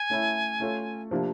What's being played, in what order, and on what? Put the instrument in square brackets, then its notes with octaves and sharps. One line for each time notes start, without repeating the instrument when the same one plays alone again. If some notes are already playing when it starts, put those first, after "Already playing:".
Already playing: [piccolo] G#5
[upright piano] A3 C#4 E4
A3 C#4 F4 A4
C3 F3 A#3 D4